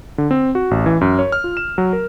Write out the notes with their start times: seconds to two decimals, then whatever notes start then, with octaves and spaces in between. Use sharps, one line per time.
0.18 D3
0.31 C4
0.55 F#4
0.71 A1
0.86 E3
1.01 F#2
1.19 C#5
1.32 F6
1.44 F4
1.57 E7
1.78 F#3
1.93 A#4